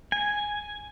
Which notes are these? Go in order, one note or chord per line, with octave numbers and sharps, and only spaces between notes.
G#5